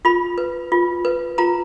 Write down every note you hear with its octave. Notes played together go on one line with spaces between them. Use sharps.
F4 B5
B4
F4
B4
F4 A#5